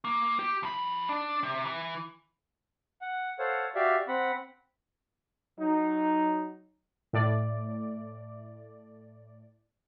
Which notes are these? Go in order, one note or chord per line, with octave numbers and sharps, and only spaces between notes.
A#3
G4
F2 B5
D4
C3
E3
F#5
A4 C5 C#5 F5 F#5
F#4 G4 D5 E5 F5
C4 F#5 B5
F#3 D#4
A2 D5